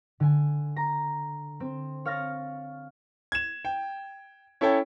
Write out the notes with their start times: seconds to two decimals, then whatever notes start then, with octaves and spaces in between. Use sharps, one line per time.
0.20 D3 G#5
0.76 A#5
1.60 C4
2.05 C#5 F5 F6 A6 A#6
3.32 G#6 E7
3.65 G5
4.61 C#4 E4 A4 C#5 G5